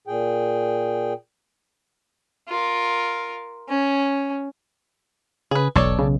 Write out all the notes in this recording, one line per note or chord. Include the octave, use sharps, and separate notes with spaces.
A#2 G#4 G5
F4 A#4
C#4
C#3 G#4 B4
E1 B1 A4 C#5 D5
C#3